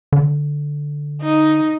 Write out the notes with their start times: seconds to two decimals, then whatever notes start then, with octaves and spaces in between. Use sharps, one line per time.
0.12 D3
1.22 D#4